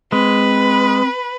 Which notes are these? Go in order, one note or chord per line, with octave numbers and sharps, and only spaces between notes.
G#3 C4 B4